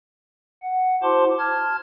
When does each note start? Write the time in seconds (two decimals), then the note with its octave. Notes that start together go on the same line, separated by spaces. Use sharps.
0.63 F#5
1.03 E4 F#4 C5 A5 C6 D6
1.39 A5 F6 G#6